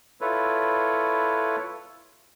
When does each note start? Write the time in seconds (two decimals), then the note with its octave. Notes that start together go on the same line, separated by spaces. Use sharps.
0.21 E4 F4 A4 B4 C#5